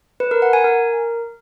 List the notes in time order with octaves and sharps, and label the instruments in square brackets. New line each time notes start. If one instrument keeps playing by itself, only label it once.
[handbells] B4
A#4
F#5
G#5
A#4